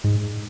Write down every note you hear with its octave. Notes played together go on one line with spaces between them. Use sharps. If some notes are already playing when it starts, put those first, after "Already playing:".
G#2